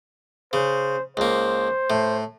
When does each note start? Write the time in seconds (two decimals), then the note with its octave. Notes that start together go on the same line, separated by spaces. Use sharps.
0.53 C#3 C5
1.17 C#2 A#3 C5
1.90 A2